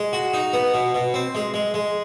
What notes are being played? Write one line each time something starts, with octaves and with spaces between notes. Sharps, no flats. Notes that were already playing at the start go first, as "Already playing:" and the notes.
Already playing: G#3
F#4
D#4
B3
B2
B2
C4
G#3
G#3
G#3